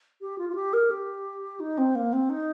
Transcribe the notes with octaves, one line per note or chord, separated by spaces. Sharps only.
G4
F4
F4
G4
A#4
G4
D#4
C4
A#3
C4
D#4